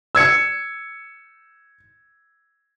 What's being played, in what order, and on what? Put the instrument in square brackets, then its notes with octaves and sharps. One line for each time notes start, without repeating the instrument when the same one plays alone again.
[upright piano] E6 G#6 C#7